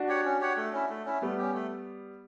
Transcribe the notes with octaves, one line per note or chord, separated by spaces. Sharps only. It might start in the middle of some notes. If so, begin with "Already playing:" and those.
Already playing: D4 F#4
G4 C#5 F#5
C#4
G4 C#5 F#5
A3
C#4 E4
A3
C#4 E4
G3 A3 B3
C#4 G4
A3